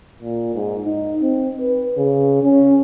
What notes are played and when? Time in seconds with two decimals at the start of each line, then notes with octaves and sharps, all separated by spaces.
0.22 A#2
0.55 G#2
0.85 D#4
1.21 C4
1.60 B4
1.97 C#3
2.43 C#4